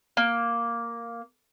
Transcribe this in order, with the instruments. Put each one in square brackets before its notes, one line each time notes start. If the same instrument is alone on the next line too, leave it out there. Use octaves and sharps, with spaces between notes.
[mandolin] A#3